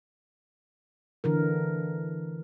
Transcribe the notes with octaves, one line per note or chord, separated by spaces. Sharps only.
D3 E3 A#4